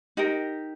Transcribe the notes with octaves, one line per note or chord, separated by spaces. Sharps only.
D#4 G4 A#4